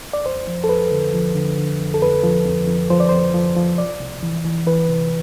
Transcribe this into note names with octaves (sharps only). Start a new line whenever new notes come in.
D5
F2 C5
F3
A4
F2 B4
D3
F3
D3
D3
F2
A4
F2 B4
F3
F2
F2
F3 C5
D5
F2 C5
F3
F3
C2 D5
C2
E3
E3
E3 B4
C3